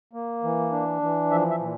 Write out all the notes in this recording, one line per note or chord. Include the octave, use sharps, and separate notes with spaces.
A#3
E3
D4
E3
F3 E5
E5
A#2